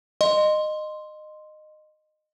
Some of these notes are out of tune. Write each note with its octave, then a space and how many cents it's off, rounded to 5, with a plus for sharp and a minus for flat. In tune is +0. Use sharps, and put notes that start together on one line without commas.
D#5 -20 C6 +0